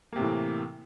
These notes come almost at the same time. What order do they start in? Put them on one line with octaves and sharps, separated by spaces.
A#3 C3 A2 E3